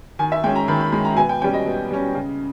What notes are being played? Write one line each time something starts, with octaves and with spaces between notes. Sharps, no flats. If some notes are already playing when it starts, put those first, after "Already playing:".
D#3 G#5
E5
G#3 C#4 G5
A#5
D#3 B5
B5
G#3 C#4 B5
A#5
B2 G#5
G5
G3 C#4 G5
D#5
B2
G3 C#4
C#3